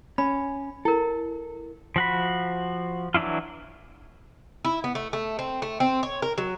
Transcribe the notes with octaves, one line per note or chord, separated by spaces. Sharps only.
C#4 B5
E4 A4 A#4
F3 F#4 B5
E3 F#3 D4 E4 F4
E4
B3
A3
A3
C4
A3
C4
C#5
A#4
F#3